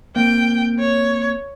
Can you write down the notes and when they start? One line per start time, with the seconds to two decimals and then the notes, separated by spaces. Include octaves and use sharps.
0.16 A#3 C4 G5
0.80 C#5